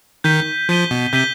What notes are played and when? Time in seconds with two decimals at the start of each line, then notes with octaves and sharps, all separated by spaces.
0.24 D#3 G6 B6 D#7 G7
0.69 F3 G6 B6 D#7 G7
0.91 B2
1.13 C3 G6 B6 D#7 G7